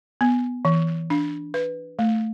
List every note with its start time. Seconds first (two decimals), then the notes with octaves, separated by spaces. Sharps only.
0.21 B3
0.65 E3
1.10 D4
1.54 B4
1.99 A3